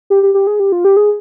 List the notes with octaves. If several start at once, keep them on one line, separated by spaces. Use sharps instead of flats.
G4
G4
G4
G#4
G4
F4
G4
G#4